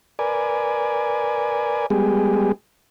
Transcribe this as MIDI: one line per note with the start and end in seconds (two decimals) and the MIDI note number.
0.19 1.86 70
0.19 1.86 71
0.19 1.86 74
0.19 1.86 80
1.90 2.52 55
1.90 2.52 56
1.90 2.52 59
1.90 2.52 67
1.90 2.52 68